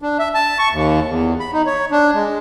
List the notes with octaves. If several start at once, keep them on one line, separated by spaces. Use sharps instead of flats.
D4
E5
A5
C#6
D#2
E2
B5
D#4
C#5
D4
G#3